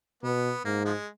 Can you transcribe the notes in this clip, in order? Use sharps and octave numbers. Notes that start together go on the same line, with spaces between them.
B2 B3
G#2 A#3
F3 G#3